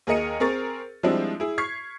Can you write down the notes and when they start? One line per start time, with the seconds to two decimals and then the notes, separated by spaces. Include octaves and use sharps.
0.07 D#2 G#4 A#4 D#5 C#7 D#7
0.40 C4 G#4 A#4 C#6 A6
1.03 F3 G3 G#3 C4 D4 E4
1.40 E4 G#4
1.58 C#6 F6 G#6 B6 C7